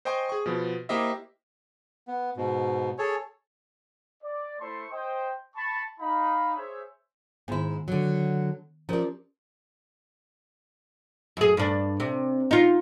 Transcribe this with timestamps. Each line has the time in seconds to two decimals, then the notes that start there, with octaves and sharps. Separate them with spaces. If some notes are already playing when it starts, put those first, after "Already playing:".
0.05 C5 D#5 G5 G#5 C6 C#6
0.29 G#4 C#6
0.46 B2 F3 B3
0.89 A#3 E4 G4 C5 D#5 E5
2.08 B3
2.37 G#2 B2
2.98 G#4 A4 C#5
4.23 D5
4.60 A3 E4 C5 A5 C6 C#6
4.92 C5 D#5 G5
5.56 A5 B5 C#6
6.00 D#4 F5 B5
6.56 G#4 C5 C#5 E5
7.48 G#2 D#3 B3 E4
7.88 D3 F#3
8.89 F3 C#4 G4 A#4 D5
11.37 F#2 G#4
11.57 G2 D4
12.00 C3
12.51 D#4 F4